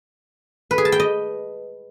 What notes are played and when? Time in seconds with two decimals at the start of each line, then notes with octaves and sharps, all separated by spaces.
0.71 B4
0.78 G#4
0.85 A5
0.92 G5
1.00 D#5